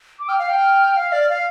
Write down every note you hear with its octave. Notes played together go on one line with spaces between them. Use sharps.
D6
G5 F6
F5
G5
F5
D5
F5